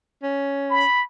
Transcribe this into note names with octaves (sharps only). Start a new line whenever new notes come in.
C#4
B5